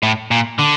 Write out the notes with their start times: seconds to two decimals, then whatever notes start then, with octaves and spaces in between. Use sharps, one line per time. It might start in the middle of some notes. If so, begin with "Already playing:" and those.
0.03 A2
0.31 A#2
0.59 D3